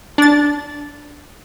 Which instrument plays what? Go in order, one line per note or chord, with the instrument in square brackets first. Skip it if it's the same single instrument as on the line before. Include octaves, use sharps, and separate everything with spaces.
[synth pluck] D4 A6